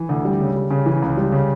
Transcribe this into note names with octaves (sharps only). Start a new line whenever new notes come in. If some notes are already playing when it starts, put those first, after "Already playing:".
Already playing: E3
D2
G3
C#3
G3
C#3
E3
C#2
G3
C#3